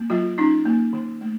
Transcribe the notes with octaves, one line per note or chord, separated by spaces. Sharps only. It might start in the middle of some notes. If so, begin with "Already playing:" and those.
Already playing: A#3
F#3 F4
C#4 D#4
A#3
D#3
A3